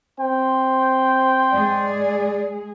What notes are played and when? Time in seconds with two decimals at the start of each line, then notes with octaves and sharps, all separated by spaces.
0.20 C4 C5 G5
1.52 G#3 G#4 D5